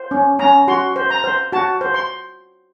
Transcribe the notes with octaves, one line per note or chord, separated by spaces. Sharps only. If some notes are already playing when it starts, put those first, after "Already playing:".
Already playing: C5
C#4
C#4 A#5
F#4 C6
C5
A#5
C5
F#4 A5
C5
C6